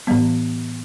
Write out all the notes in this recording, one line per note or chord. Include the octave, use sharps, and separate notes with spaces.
A2 E3 G3 B3